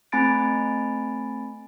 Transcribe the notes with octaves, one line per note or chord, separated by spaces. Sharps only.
A3 C4 G#5 B5 A6 D7